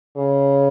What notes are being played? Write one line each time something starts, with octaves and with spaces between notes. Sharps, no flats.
C#3